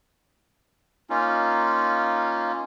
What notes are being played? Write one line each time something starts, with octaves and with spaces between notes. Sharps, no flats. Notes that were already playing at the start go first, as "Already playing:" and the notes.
A#3 C#4 D#4 F4